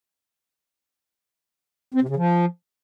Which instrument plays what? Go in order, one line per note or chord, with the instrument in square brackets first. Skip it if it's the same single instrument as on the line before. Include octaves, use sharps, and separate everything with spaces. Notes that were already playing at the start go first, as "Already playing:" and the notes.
[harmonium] C4
C3
C#3
F3